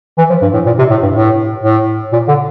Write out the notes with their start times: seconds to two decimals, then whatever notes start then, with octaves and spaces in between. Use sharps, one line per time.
0.18 E3
0.30 F3
0.42 G2
0.54 A2
0.66 A#2
0.78 C3
0.90 A2
1.03 G2
1.15 A2
1.63 A2
2.12 A#2
2.28 D3